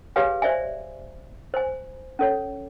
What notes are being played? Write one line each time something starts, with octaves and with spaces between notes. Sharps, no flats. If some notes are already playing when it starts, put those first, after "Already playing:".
G4 G#4 B4 C#5 F5 G#5
C5 D5 E5 G#5
C5 G#5
C#4 A4 C#5